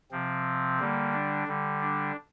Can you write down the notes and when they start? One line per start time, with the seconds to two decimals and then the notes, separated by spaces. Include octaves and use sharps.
0.12 C3 F3 C4
0.79 D3 G3 A#3
1.13 D4
1.47 D3 G3
1.81 D4